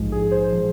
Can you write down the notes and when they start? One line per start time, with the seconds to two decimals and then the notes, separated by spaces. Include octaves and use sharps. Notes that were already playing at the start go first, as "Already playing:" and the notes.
Already playing: A#1 G#2 F3 G#3
0.12 G#4
0.31 G#4 C5
0.51 A#2 F3